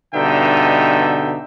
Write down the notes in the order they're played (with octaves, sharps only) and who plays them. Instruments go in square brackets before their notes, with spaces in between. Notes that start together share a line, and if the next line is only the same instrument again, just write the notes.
[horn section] G2 B2 D3 D#4 E5 G5